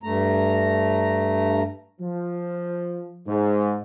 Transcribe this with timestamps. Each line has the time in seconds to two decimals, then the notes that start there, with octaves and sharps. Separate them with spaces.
0.03 G2 A3 A#5
2.01 F3
3.27 G#2